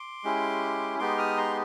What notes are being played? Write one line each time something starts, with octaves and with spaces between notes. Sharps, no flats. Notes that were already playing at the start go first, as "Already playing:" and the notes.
Already playing: C6 D6
G#3 C#4 E4 G4
G#3 B3 D#4 G4 C6 D6
D#6 F6
A#5 C6